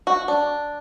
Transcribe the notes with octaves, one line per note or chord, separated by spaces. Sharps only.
F#4
D4